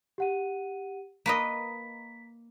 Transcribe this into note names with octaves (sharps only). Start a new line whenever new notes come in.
G4 F#5 D#7
A#3 B4 D#5 A#5 B6